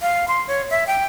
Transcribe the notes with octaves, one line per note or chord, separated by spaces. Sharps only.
F5
C6
C#5
E5
G5